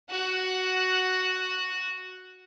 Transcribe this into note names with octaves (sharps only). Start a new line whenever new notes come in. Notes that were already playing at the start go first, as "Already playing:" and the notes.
F#4 F#5